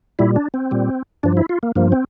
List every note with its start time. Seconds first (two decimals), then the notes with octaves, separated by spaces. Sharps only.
0.19 A#2 G3 E4
0.36 D4
0.54 C4
0.71 A#2 G3
1.23 G2 F3 D4
1.37 E4
1.49 F4
1.63 A#3
1.76 G2 F3 A#3
1.92 C4